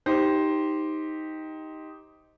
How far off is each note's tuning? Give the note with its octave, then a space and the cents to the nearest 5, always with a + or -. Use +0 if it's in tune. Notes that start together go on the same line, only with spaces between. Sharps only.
D#4 +10 G4 +0 C5 +0